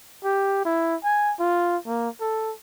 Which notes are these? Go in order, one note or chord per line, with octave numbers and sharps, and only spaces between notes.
G4
E4
G#5
F4
A#3
A4